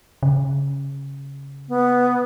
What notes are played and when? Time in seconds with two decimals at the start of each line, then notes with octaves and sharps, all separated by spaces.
0.23 C#3
1.69 B3